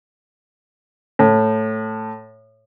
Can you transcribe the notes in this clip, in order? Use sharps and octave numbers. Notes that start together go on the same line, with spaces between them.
A2